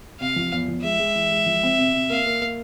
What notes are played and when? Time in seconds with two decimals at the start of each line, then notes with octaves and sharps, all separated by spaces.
0.20 C3 F5
0.36 F3
0.52 E2
0.68 F3
0.83 G#3 E5
0.99 G#3
1.15 E3
1.31 G#3
1.46 F3
1.63 C4
1.78 C3
1.94 C3
2.10 A#3 F5
2.26 A#3
2.42 A#3